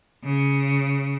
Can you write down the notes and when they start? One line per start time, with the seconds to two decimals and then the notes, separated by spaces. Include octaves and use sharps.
0.24 C#3